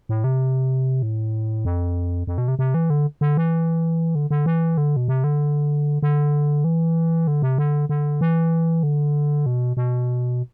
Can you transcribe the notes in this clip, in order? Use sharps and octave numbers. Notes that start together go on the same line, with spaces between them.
A2
C3
A2
F2
F2
B2
C3
C3
E3
D3
D3
E3
D3
D3
E3
D3
B2
C3
D3
D3
E3
D3
C3
D3
D3
E3
D3
B2
B2